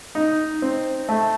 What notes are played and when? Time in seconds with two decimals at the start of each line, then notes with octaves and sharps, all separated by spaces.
0.15 D#4
0.62 C4
1.09 A3